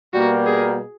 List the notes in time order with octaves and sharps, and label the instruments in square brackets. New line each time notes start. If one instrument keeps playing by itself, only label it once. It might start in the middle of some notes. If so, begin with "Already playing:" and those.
[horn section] B2 G3 A#3 [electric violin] F#4
[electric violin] G#4